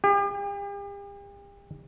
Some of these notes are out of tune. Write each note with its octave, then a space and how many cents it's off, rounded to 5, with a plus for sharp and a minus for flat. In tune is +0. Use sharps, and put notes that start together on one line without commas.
G4 +40